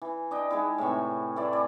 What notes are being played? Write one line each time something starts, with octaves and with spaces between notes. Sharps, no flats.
E3
D4 D#5 G5
G#3 D#4 E4
A2 C3 E3 C#6
E3 A3 E4 D5
E3 D5